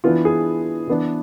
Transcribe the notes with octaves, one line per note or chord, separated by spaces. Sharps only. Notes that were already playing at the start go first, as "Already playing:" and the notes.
E3 B3 D4 F4
G#4
E3 B3 D4